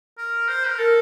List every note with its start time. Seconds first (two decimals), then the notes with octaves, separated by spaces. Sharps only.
0.18 A#4
0.48 C5
0.67 A#4
0.78 A4 A#4